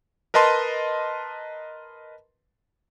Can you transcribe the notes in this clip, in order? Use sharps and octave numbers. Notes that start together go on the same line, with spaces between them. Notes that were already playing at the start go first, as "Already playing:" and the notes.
A#4 B4 D#5 A5 C6